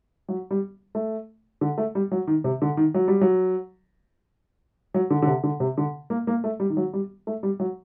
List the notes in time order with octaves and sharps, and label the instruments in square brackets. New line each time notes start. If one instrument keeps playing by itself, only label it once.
[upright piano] F#3
G3
A3
D3
A3
G3
F#3
D#3
C3
D3
D#3
F#3
G3
F#3
F#3
D3
D3
C3
D3
C3
D3
A#3
A#3
A3
G3
D#3
F#3
G3
A3
G3
F#3